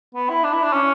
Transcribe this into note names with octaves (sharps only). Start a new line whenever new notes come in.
B3
E4
D4
E4
D4
C#4